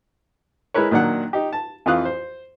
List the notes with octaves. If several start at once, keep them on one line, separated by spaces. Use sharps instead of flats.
G#3 E4 A#4 B4 C#5
A#2 D#3 F#3 D4 F#5
D#4 G4
A5
F2 E3 F4 F5 D#6 F#6
C5